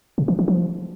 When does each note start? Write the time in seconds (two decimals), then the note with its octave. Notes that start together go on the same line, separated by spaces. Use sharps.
0.18 C3
0.28 E3
0.39 E3
0.48 F3